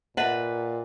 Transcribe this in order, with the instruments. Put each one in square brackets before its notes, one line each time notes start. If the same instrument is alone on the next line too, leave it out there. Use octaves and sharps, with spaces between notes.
[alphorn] A#2 [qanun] B4 A5 B5 [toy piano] D#5 E5 F#5